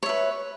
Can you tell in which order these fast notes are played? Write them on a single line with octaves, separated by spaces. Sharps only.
C#5 E5 B4